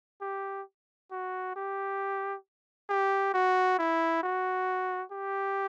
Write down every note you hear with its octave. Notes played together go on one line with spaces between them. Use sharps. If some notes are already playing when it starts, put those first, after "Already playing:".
G4
F#4
G4
G4
F#4
E4
F#4
G4